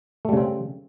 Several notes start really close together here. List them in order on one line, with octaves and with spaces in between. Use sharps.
A3 G3 C#3 C4